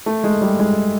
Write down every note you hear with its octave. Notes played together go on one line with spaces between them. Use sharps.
A3
G#3
G3
G#3